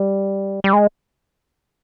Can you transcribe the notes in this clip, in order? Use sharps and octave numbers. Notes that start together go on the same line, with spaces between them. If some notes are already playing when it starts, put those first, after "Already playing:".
Already playing: G3
G3
G#3